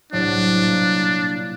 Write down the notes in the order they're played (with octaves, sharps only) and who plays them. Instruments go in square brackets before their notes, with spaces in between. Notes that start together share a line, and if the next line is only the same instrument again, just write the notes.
[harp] C2 A2 F#3 [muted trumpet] D4
[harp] A#2 A#3